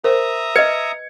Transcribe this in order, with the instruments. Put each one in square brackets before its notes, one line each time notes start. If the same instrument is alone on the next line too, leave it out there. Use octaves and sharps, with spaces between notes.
[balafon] A#4 C5 [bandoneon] E5 A#5 D#6
[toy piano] B4 D#5 [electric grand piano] G#6 C#7